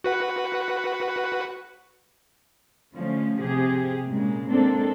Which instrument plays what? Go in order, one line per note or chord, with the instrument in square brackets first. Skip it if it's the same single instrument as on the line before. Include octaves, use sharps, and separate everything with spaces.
[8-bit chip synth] F#4 B4 F#5
[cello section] D3 F3 A3 C#4
C3 G4 G#4
A#2 C#3 G#3
G#3 A#3 C4 D4 A4